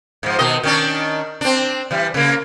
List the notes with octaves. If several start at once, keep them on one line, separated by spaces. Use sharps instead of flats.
G#2 F3
B2 D#3 D#5
D#3 C#4 D4
C4 D4
E3 G3
C#3 A#3